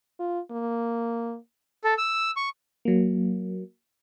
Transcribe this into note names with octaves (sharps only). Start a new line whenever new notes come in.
F4
A#3
A4
E6
C#6
F#3 A#3